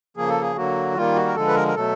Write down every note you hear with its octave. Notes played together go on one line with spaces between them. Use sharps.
C#3 F3 A#3 G#4
A4
G#4
D3 F#3 A#3 F#4
D#3 G3 A#3 F4
F#4
A#4
D3 F3 G#3 A4
B4
A#4
A#4
B2 F#3 A3 A4